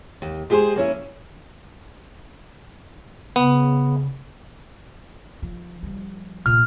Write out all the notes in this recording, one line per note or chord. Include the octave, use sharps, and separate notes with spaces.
D#2
G#3 G4 G#4 A#4 C5
A#3 C#4 E4
C#3 B3
F3
F3 G3
A#2 C#4 F6